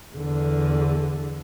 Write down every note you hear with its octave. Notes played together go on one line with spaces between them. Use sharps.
E2 D3